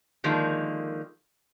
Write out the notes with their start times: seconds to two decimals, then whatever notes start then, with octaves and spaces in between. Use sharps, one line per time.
0.24 D3 D#3 F3 G#3 A#3